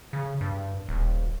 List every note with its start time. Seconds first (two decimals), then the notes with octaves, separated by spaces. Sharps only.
0.13 C#3
0.41 G2
0.89 D#1